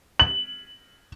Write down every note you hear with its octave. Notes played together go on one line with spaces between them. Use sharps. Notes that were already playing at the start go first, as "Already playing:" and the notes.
F#7